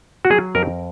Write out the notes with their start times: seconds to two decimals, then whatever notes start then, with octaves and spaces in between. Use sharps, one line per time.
0.25 F#4
0.30 F#3 G#4
0.55 F2 A#4